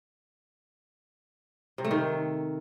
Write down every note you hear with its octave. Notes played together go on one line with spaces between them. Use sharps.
C3
A3
D#3